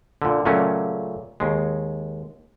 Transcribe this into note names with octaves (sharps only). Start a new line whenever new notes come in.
A#2 D3
A#2 C#3 F#3 A3 A#3 C#4
D#2 G#3